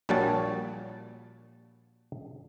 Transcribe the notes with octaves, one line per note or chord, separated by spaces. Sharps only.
A#1 A#2 G3 F#4 C#5 A5